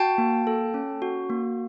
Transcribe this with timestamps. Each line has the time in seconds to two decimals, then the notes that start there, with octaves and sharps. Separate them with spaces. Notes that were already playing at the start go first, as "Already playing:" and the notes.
Already playing: F#4 G5 A5
0.18 A#3
0.47 A4
0.74 C#4
1.02 F#4
1.30 A#3